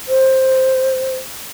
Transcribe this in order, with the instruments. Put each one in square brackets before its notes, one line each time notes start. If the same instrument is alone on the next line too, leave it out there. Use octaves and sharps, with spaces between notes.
[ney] C5